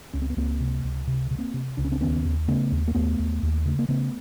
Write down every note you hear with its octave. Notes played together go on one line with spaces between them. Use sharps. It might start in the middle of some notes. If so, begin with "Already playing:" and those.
C#2 C#4
C4
B3
C#2 A#3 C4
C3
C#2
C3
C3
A#3 C4
C3
C#2 D4
C#4
C4 D4
D#2 B3 C#4
D#2
C#3 A3 B3
D#2
A#3
D#2 A3 B3
D#2
D#2
C#3 A3
A#3
C#3 A3 B3